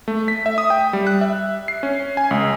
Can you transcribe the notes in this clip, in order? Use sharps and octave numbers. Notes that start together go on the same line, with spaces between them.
A3
B6
E5
D#6
G5
G3
F#6
E5
C7
C#4
G#5
C#2